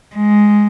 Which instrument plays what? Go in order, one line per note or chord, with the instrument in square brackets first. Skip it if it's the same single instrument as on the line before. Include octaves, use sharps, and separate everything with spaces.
[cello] G#3